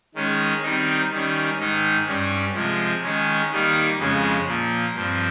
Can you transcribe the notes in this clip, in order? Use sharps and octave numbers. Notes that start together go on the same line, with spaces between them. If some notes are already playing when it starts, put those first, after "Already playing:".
D#3 G#3 C#4
D#3 G3 C4 D#4
D#3 G3 C#4
G#2 D#3 G#3 D#4
G2 G3 C#4
C3 F3 G#3
D#3 G#3 C#4
D#3 G3 A#3 D#4
F2 C#3 G#3 C#4
A#2 F3 A#3
G2 F3 C4